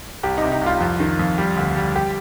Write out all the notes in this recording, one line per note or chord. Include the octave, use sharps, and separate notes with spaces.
C2 G4
C3 D#4
D#4
C2 F4
F2
D#3
F2
G3
D2
G3
G4